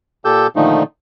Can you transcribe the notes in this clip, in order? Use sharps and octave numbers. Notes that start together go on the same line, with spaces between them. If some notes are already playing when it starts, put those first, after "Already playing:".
A#2 G4 A4 E6 G6
A#2 D3 D#3 F3 A3 D#4